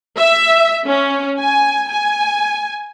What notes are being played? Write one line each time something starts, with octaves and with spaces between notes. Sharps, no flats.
E5
C#4
G#5
G#5